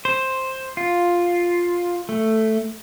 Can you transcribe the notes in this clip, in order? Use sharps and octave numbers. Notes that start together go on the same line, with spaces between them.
C5
F4
A3